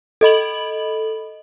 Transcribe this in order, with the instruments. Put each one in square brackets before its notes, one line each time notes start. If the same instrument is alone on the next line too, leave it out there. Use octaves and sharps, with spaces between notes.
[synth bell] A4 D#5 B5 F#7